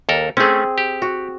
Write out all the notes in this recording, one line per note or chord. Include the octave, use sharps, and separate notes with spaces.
D#2 A4 A#4
A3 C4 C#4 G#4
G4
F#4